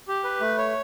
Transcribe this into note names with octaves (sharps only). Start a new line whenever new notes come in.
G4
B4
A3
C#5